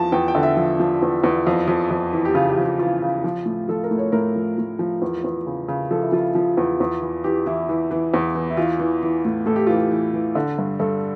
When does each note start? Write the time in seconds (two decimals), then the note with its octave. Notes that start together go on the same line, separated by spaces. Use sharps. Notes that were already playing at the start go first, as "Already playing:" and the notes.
Already playing: E2 F3 A5
0.12 E2 G5
0.28 G5
0.35 D3
0.43 E5
0.57 F3
0.80 F3
1.02 E2
1.24 E2
1.47 F2
1.68 F2
1.90 F2
2.13 E3
2.25 G4
2.35 C#3 F4
2.49 G4
2.58 F2
2.65 F4
2.79 E3 F4
3.02 C#3
3.24 F3
3.46 A2
3.69 F3 A4
3.84 A#4
3.91 A2
3.98 C#5
4.12 A2 A#4
4.36 F3
4.58 A2
4.79 F3
5.02 E2
5.24 E2
5.46 C#3
5.68 C#3
5.91 F3 A4
6.03 E4
6.12 F3 F4
6.35 F3
6.57 E2
6.80 E2
7.02 E3
7.24 E3 G4
7.46 E3 E4
7.69 E3
7.91 E3
8.14 E2
8.35 E3
8.50 E4
8.57 E3 F4
8.79 E3
9.03 E3
9.25 A2
9.46 A2 A4
9.56 G4
9.67 E3 F4
9.76 G4
9.91 E3
10.14 E3
10.35 D3
10.58 G2
10.79 G2 A4